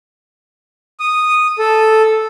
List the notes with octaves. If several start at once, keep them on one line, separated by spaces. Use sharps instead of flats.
D#6
A4